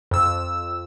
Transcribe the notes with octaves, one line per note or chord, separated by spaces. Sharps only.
F2 E6